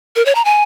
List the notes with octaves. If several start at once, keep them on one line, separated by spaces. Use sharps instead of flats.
A#4
C#5
A#5
G#5